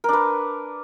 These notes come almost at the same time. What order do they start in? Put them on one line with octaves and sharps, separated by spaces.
A#4 D4 B4